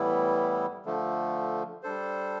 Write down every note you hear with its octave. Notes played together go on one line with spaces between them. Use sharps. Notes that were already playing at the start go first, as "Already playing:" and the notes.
Already playing: A2 E3 G3 B3 E4
D3 F3 A3
G3 D4 A4 C5